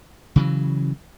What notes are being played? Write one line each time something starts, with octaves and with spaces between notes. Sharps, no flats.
C#3 E3 F#3